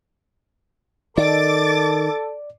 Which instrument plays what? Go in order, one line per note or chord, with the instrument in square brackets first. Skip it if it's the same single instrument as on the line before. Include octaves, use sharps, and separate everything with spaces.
[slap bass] D#3 [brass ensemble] A4 [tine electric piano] D5 [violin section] D6 A6